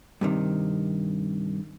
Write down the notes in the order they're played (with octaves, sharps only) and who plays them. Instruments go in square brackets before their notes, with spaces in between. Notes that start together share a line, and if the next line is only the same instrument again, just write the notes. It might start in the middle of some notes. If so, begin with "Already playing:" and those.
[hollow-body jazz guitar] G2 C3 D#3